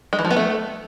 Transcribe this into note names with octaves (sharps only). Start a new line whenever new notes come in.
G#3
E3
F3
B3
A3